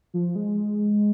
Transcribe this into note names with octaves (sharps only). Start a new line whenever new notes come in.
F3
G#3